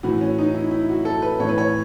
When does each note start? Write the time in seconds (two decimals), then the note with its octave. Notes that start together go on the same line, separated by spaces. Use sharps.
0.03 A2 E3 F#4
0.21 C#4
0.38 D#4
0.55 E4
0.71 E4
0.89 F#4
1.05 A4
1.22 B4
1.40 A2 E3 C#5
1.49 B4
1.58 C#5